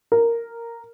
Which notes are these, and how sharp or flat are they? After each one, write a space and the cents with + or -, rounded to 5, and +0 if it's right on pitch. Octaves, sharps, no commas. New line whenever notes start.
A#4 -5